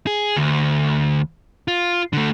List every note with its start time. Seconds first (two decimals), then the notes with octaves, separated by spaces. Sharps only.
0.07 G#4
0.37 D2
1.68 F4
2.13 D3 A3